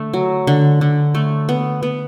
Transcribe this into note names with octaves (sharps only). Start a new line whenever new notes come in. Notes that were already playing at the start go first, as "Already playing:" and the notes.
Already playing: D3 A3
F#3
D3
D3
A3
B3
B3